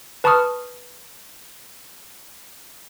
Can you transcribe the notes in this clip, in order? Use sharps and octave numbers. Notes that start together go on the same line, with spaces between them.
B4 A5 B5 C#6 D#6 F6